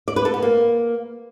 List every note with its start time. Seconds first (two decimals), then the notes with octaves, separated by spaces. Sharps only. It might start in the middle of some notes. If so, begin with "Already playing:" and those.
0.08 D5
0.16 B4
0.25 A4
0.34 B3
0.42 A#3